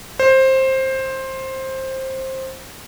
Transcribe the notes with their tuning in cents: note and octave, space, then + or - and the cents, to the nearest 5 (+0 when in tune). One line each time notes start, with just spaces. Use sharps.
C5 +15